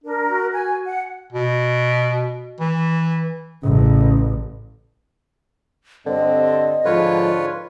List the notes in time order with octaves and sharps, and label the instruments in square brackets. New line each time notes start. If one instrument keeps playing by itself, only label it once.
[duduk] D4 [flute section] A#4
[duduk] F#4
[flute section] G#5
F#5
[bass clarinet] B2
E3
[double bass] A1 [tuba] C#3
[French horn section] G2 C4 [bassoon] D3 [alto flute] D#5
[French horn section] G#2 F3 [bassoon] D3 [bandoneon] F4 B4 C#5